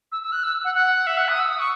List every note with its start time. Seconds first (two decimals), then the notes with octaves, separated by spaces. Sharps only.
0.12 E6
0.22 E6
0.32 F#6
0.44 E6
0.64 F#5
0.75 F#5
1.07 E5
1.18 F#5
1.28 D#6
1.40 E6
1.50 D#6
1.59 C#6